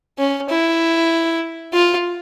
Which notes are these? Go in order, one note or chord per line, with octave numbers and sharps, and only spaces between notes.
C#4
E4
F4